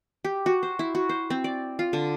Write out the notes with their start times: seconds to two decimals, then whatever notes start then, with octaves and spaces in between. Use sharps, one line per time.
0.24 G4
0.46 F#4
0.63 C5
0.79 E4
0.95 F#4
1.09 C5
1.30 C4
1.44 D5
1.79 F4
1.93 D3